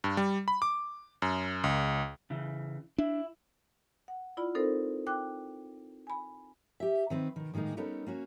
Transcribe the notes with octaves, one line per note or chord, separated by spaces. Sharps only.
G2
G3
B5
D6
F#2
C#2
C#3 E3
D4 E4
F#5
E4 F4 D5 B5
C4 D#4 A4 A#4 C5
G5 D6 F#6
G#5 B5
G4 E5
D#3 C4 B4
B2 D#3
A2 D#3 G#3 A#3 D#4
G3 B3 C#4 D#4 A4 A#4
A#3 C#4 F#4